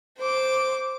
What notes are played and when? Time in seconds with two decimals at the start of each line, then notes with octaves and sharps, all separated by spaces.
0.18 C5 D6